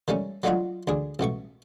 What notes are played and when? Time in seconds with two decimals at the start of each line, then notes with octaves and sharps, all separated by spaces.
0.08 D#3 G3 A3 C#4
0.43 F#3 A3 D4 D#4 F4 F#4
0.88 D2 D4 G#4
1.19 A1 B2 A3 C#6